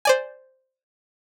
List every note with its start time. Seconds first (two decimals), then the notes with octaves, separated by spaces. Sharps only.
0.05 C5 D5 G#5